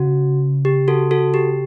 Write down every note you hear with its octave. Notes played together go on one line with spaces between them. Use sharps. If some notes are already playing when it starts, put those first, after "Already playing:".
Already playing: C#3 F#4
G4
F#4 A4
F#4 A4
G4